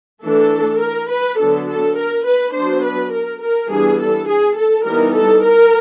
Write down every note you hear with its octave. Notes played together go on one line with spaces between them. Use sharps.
E3 A3 D4 A4
A#4
B4
D3 F#3 B3 D4 A4
A4
A#4
B4
F#3 B3 D4 C5
B4
A#4
A#4
E3 G3 B3 D4 G#4
A4
G#4
A4
E3 G3 B3 D#4 A#4
A4
A#4